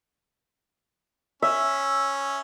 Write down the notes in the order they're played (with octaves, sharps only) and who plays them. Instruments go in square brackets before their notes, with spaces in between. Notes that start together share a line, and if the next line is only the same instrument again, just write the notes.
[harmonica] C#4 [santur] E5